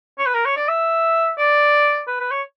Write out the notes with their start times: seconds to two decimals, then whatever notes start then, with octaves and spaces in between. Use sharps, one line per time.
0.19 C#5
0.26 B4
0.34 A#4
0.46 C#5
0.57 D5
0.68 E5
1.38 D5
2.08 B4
2.20 B4
2.31 C#5